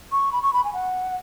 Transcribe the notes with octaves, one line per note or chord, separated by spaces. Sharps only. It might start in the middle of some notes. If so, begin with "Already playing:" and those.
C#6
B5
C#6
B5
G#5
F#5